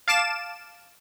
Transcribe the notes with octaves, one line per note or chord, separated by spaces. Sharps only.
F5 A5 D6 E7